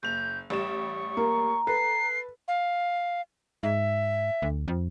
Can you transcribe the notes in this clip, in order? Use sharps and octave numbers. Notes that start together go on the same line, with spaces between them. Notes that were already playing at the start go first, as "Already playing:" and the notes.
F#1 G6 F7
A1 G3 C#6 E7
A#3 A#5
A4 B4 C7
F5
G#2 E5
D2
F2